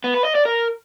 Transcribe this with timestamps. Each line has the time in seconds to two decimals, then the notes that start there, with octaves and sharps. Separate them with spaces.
0.04 B3
0.14 B4
0.25 D#5
0.35 D5
0.45 A#4